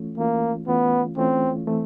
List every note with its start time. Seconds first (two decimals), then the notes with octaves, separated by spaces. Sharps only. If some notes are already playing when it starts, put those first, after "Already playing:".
Already playing: E3 A3 C#4 F4
0.18 E3 A3 A#3 C#4 F4
0.68 E3 A3 B3 C#4 F4
1.17 E3 A3 C4 C#4 F4
1.67 E3 A3 C4